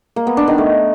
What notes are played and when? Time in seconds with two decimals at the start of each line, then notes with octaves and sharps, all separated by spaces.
0.16 A#3
0.27 B3
0.37 D4
0.48 D#3
0.58 A3